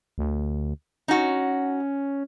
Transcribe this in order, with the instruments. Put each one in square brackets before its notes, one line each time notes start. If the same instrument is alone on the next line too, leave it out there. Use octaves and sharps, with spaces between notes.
[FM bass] D2
[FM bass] C#4 [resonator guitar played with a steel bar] D#4 F#4